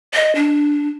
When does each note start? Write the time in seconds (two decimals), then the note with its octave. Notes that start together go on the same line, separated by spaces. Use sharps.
0.14 D#5
0.35 D4